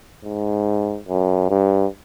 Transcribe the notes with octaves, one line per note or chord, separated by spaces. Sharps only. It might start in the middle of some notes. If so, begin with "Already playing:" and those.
G#2
F#2
G2